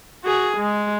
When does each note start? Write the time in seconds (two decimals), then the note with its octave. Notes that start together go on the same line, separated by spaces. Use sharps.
0.24 F#4 G#4
0.57 G#3